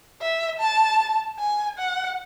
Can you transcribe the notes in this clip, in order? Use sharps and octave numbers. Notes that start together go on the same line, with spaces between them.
E5
A5
G#5
F#5